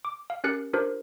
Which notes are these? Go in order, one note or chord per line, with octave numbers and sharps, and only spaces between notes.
D6
F5
C#4 G4 A#4 F#6 A6 C#7
D4 F4 G4 A#4 C5